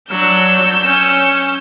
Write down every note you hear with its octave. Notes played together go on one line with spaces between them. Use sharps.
F#3 D4 E6 G6
C#4